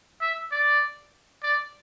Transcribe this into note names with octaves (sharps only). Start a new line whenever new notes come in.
E5
D5
D5